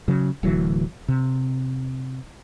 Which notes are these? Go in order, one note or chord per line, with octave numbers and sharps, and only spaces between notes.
C#3 F#3
D1 D2 E3 F#3
C3